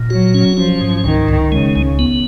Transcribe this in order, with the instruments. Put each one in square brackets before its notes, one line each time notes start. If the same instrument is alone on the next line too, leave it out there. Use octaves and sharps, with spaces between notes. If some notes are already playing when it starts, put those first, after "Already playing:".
Already playing: [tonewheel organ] A#2
[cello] F#3 [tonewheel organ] F#4
[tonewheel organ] C#4
[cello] F3 [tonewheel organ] C#4
[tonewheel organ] G#2
[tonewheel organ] C#2 [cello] D#3
[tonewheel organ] C#2
[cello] C#3 [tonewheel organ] G#3
[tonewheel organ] C#2
B3